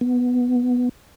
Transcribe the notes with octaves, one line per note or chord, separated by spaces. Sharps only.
B3